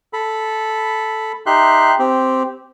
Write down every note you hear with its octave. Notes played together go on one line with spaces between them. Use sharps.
A4 B5
D#4 G4 E5 C6 F#6
C4 G4